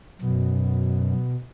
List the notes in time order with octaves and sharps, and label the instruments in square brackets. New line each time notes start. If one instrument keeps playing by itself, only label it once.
[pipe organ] F#2 [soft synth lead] B2